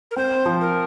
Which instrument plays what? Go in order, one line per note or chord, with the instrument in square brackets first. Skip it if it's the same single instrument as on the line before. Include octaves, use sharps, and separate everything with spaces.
[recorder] A#4
[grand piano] C4 [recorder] C5
[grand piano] F3
[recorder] A#4